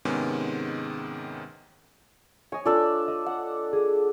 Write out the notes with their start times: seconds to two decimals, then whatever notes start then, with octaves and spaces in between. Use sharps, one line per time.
0.05 G#2 C3 D#3 G#3 B3 C#4
2.52 C#5 D#5 G#5
2.65 D4 F4 A4 D5
3.08 D#5
3.26 F#5
3.72 G#4